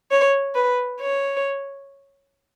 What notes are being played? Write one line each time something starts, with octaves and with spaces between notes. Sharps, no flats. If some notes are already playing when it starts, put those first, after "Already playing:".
C#5
B4
C#5